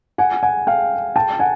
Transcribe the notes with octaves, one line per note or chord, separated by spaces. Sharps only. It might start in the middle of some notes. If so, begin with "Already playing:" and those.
F#5 G#5
F#5 G#5
F5 G5
G5 A5
F#5 G#5